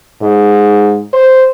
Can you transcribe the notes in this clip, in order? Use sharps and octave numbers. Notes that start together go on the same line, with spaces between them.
G#2
C5